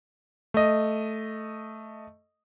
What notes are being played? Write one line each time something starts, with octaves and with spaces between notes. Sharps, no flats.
A3 D#5